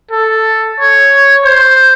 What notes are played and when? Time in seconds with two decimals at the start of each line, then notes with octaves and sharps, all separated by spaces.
0.11 A4
0.80 C#5
1.44 C5